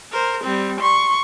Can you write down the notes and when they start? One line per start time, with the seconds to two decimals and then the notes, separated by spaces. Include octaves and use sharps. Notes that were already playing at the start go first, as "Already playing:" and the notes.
0.11 A#4 C5
0.43 G3 C4
0.80 C6 C#6